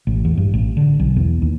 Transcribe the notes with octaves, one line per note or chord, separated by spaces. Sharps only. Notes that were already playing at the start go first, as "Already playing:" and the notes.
A1
E2
G2
A1
D3
B1
E2
D#2